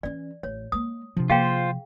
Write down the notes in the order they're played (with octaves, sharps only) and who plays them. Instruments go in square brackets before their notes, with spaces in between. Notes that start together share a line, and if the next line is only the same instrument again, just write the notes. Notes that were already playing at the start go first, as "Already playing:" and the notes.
[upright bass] E3 C#4 [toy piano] D5
[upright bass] A1 [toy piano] C#5
[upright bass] G#3 A#3 [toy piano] D#6
[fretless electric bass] C3 F3 [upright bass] D4
[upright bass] A#3 [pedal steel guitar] F4 C5 [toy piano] G#4 F5 G5